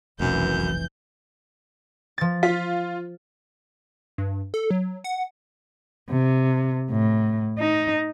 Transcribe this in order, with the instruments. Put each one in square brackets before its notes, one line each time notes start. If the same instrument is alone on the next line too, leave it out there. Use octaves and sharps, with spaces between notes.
[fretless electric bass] F1 [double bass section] B1 E3 [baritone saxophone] F#2 [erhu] G6
[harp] F3 A6
[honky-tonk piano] F4 [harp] B6
[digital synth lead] G2
A4
F#3
F#5
[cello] C3
A2
D#4